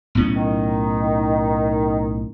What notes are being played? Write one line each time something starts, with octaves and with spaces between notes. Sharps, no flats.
B1 A2 C#4
D#3